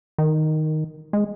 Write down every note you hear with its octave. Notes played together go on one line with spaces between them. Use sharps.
D#3
G#3